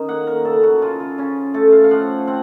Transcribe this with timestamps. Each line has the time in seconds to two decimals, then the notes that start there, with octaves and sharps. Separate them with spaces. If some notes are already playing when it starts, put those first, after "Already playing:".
Already playing: D#3 C#4 D#5
0.08 A#3 F#5
0.27 A#4
0.45 C#3 A4
0.63 F#4
0.82 C#3 F4
1.00 F4
1.18 C#3 C#4
1.54 A3 A4
1.72 F5
1.84 F5
1.91 F3 F#5
2.27 C4 F#5